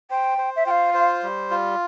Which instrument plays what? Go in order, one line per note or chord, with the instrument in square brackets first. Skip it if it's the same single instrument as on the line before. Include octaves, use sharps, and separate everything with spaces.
[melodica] C5 [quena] G5
[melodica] C5
[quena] E5
[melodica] F4 [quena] G5
[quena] F5
[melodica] C5
G3
F4